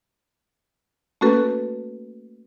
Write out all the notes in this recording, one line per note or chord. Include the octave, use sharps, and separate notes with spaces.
A3 A#3 C#4 F#4 A4 B4